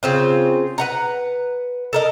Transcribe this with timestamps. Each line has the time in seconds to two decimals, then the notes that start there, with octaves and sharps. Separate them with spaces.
0.03 C#3 C4 F4
0.78 B4 F#5 A#5
1.93 A4 A#4 D#5